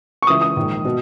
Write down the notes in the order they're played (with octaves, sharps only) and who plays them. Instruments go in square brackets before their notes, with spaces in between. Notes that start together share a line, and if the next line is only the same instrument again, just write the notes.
[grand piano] C#6
C#2 C#3 E3 D#6
D#6
A#1 G#2 D#3
B2